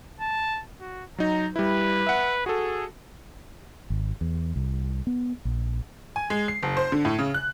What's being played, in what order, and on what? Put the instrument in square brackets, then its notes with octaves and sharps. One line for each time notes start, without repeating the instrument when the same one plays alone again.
[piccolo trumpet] A5
F#4
[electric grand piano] F#3 D#4 [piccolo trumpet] A#5
[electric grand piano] G3 E4 [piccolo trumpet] B4
[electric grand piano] E5 F#5
[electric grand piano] F#4 A4 [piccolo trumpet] G#4
[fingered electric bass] G#1
E2
C2
B3
A#1
[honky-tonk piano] G#5
G#3
C7
F#1
C5
D3
A2
C#3
F#6